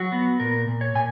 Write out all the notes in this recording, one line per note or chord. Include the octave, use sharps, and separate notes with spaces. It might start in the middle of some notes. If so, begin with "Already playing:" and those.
Already playing: F#3 F#4
B3
A#2 A#4
A#2
C#5
A#2 G#5